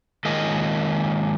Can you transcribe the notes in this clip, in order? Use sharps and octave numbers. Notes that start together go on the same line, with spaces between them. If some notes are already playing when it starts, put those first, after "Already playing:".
D#3 G#3 A#3 C#4 F4 D#5